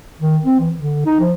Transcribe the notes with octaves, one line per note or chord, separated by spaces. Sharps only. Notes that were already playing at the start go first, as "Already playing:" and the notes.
D#3
C4
E3
D3
D#4
F3